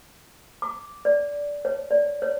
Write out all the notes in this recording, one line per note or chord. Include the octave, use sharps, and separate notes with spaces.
D6
D5
C#5
D5
C#5